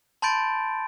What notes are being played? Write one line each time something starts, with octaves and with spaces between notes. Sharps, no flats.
A5 B5 C6 G6 A6 D7